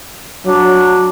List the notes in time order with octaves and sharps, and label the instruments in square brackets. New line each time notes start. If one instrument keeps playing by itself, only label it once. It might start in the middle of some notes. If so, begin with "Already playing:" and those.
[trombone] F#3 [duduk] D4